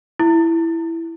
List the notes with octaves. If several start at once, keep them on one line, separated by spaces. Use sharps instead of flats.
E4